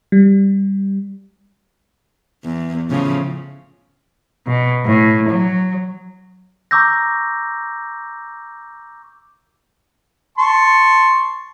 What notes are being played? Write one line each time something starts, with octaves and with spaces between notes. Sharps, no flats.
G3
E2
A2 C#3 F3
B2
A2
F#3
A#5 C#6 D6 E6 G6 A#6
A5 C6 C#6